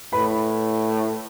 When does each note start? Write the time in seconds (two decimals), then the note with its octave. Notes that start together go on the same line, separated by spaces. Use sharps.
0.12 A2 B4 B5